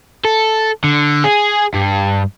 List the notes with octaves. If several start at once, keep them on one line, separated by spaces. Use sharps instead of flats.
A4
D3
G#4
G2